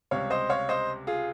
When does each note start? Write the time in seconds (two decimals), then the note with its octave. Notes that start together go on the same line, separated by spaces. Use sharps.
0.11 C#2 C3 G3 C#5 F5
0.30 C5 D#5
0.50 C#5 F5
0.69 C5 D#5
1.07 F4 G#4